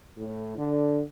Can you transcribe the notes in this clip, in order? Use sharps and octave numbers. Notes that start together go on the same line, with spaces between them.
A2
D3